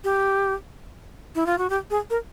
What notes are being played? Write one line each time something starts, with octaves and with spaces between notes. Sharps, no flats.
G4
E4
F4
F#4
G4
G#4
A#4